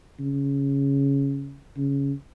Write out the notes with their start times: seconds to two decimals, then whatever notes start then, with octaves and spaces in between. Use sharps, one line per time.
0.19 C#3
1.77 C#3